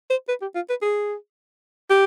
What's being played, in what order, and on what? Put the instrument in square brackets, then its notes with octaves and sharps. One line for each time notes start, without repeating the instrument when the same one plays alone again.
[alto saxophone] C5
B4
G4
F4
B4
G#4
G4